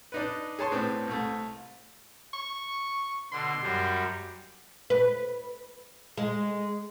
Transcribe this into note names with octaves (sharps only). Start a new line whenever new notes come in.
D4 D#4 B4
G#4 C#5 A5 C6 C#6
A2 B3 C4 D4
C2 A3
C#6
B2 D3 C6
F#2 F#3 G3
B4
G#3